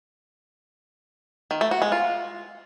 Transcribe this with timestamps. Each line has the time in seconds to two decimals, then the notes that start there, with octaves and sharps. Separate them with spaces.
1.51 D#3
1.61 A3
1.71 F#4
1.82 G#3
1.92 F4